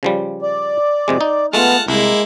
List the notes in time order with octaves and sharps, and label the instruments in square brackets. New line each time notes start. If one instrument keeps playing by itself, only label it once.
[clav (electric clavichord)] C#3 F3 G3
[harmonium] D5
[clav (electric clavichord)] F2 C3 G#3
D#4
[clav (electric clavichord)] G#3 A3 F4 [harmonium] B3 [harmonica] F#5 A5 F6
[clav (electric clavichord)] C2 [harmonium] G#3 [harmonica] A#3 E4